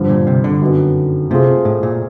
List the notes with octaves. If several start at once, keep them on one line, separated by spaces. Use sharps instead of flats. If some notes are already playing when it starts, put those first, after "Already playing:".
Already playing: G2 D3 F3
A#2
C3
D3
F#2 D#3 F#3 B3
C3 A3 C4 F4 G#4
A2
A#2